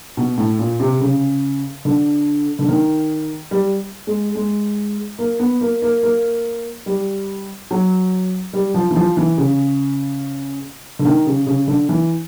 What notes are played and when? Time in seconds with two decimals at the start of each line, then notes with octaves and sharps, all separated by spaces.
0.17 B2
0.38 A2
0.59 A#2
0.80 C3
1.01 C#3
1.85 D3
2.59 D3
2.69 D#3
3.51 G3
4.07 G#3
4.35 G#3
5.19 A#3
5.40 B3
5.61 A#3
5.82 A#3
6.03 A#3
6.86 G3
7.71 F#3
8.53 G3
8.74 F3
8.91 E3
8.96 F3
9.17 E3
9.38 C#3
10.99 D3
11.05 D#3
11.26 C#3
11.47 C#3
11.68 D3
11.89 E3